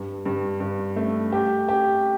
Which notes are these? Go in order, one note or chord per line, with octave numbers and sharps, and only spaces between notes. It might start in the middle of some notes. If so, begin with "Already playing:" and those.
Already playing: G2
G2
G2
A3
G4
G4